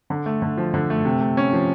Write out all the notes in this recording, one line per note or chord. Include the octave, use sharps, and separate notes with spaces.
D3
A3
D3
F3
D3
A3
C3
A3
C#4
F3